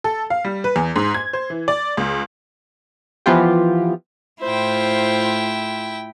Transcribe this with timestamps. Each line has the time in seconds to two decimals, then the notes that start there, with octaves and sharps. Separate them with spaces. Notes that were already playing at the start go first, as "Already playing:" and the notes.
0.04 A4
0.30 F5
0.45 G3
0.64 B4
0.76 E2
0.96 G#2
1.14 G#6
1.33 C5
1.50 E3
1.68 D5
1.97 C#2
3.26 E3 F3 B3 F4 G4
4.43 A2 E4 F4 C5 G5